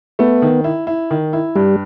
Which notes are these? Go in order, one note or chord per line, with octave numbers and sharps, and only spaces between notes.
A3 B3
D#3
E4
E4
D#3
E4
G2 G3